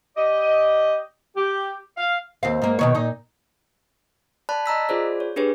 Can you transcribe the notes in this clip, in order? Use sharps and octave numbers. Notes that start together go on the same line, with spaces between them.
G4 D5 D#5
G4
F5
D#2 C4 F5
G#2 A#3
B2 D#3 C#5
A#2 D#4
D5 A5 B5 F#6
D#5 A#5 E6 B6
F4 G#4 C5 D5
C#5
D4 G4 G#4 B4 C#5